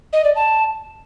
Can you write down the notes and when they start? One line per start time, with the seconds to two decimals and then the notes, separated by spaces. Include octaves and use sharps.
0.13 D#5
0.24 D5
0.36 A5